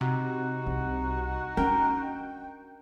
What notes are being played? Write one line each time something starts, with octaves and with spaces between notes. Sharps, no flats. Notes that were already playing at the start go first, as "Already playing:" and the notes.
C3 D#4 F#4
C2
C#4 D4 A#4 G5